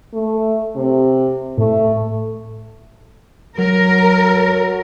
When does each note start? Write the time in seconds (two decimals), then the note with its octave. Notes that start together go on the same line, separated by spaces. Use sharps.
0.14 A3
0.76 C3
1.58 A2 A3
3.58 F#3 A#4